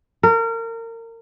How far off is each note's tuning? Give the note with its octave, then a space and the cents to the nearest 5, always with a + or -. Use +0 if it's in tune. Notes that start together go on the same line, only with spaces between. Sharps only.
A#4 -30